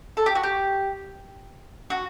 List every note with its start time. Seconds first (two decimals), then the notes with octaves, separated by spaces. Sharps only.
0.17 A4
0.26 G4
0.35 F#4
0.43 G4
1.90 F#4